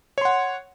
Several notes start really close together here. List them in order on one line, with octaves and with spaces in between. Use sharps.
C#5 C6 F#5